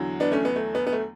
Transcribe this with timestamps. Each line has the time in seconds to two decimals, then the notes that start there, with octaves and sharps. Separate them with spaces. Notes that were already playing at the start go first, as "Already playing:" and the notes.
Already playing: E2 D3 F#3
0.20 B3 D4
0.32 A3 C#4
0.45 B3
0.56 A3
0.75 B3
0.87 B3
0.92 A3